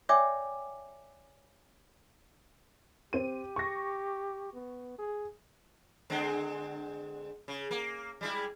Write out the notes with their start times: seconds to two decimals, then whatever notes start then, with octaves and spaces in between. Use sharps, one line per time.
0.09 C#5 D5 E5 G5 G#5 D6
3.13 C4 G4 D#7
3.56 C#6 A#6
4.54 B3
4.98 G#4
6.10 D3 G#3 C4
7.48 C#3
7.71 A#3
8.21 G3 G#3 E4